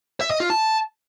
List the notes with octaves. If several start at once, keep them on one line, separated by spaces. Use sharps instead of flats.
E5
D#5
F4
A5